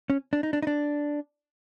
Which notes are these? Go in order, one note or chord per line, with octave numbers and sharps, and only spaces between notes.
C#4
D4
D#4
D4
D#4
D4